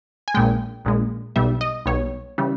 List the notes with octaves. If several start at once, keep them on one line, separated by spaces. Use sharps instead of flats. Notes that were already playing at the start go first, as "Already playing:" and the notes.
G#5
A#1 A#2 G#3 G5
A#1 A#2 G#3
B1 B2 G3 E5
D#5
B1 B2 G3 C#5
C#3 E3 G3